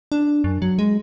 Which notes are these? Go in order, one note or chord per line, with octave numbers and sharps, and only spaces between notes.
D4
F#2
F#3
G#3